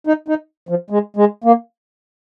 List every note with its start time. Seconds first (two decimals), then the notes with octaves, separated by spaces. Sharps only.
0.07 D#4
0.28 D#4
0.69 F3
0.90 G#3
1.17 G#3
1.44 A#3